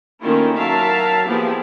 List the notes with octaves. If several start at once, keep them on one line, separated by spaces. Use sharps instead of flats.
D#3 A3 A#3 C#4 E4 F4
F#3 A#4 E5 F5 A5
F3 A#3 B3 E4 G4 G#4